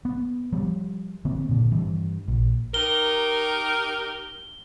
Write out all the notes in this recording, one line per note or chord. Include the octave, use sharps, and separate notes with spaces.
B3
F3 G3
D3 A#3 C4
A#2 D3
G2 E3
A#1
D#4 G4 A#4 G7